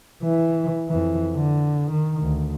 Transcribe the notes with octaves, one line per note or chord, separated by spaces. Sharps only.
E3
F2 E3
D3
D#3
D2